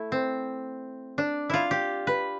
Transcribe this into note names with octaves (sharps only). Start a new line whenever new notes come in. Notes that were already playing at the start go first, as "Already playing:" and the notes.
Already playing: A3 E4
C4
D4
E4 F4
G4
B4